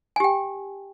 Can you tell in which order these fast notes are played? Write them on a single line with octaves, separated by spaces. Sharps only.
G#5 G4 G5